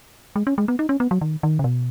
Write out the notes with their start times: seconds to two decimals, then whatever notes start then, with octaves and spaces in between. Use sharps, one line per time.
0.36 G#3
0.47 C#4
0.58 G#3
0.68 B3
0.79 D#4
0.89 C#4
1.00 B3
1.11 F#3
1.21 D#3
1.43 D#3
1.59 C#3
1.64 B2